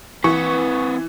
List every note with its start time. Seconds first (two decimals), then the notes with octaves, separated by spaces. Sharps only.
0.24 E3 C4 B4 C#6